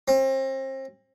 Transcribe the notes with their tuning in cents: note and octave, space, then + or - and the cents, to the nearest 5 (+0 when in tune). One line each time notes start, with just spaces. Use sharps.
C4 +35